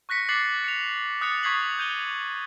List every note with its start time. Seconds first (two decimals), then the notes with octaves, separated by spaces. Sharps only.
0.09 C#6 F#6 A#6 B6 C#7
0.29 D6 F#6 A6 C7 C#7 F#7
0.64 C#7 F7
1.21 D#6 F#6 A6 C#7 F7
1.43 C#6 D#6 G#6 B6 C7 F#7
1.79 G6 D#7 G7